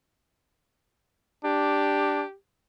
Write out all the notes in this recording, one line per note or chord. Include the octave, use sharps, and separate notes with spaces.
D4 G4